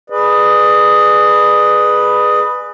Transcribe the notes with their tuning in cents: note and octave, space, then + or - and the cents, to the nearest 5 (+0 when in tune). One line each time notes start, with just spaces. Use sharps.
G#4 +0 B4 +0 D5 +40